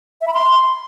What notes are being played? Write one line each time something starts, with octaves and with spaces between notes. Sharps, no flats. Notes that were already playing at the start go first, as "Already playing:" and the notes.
E5
B5
C6